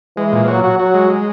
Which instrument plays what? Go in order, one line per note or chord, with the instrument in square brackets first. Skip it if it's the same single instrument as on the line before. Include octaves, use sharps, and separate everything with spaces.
[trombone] E3 [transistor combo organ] G#3
[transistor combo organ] A#2
[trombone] F#3 [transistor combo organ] F#4
[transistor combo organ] F#4
[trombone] F#3 [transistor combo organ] F#4
[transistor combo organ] G#3
G#3